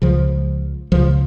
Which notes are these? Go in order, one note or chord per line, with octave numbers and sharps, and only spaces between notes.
C#2 C#3 F3
C#2 C#3 F3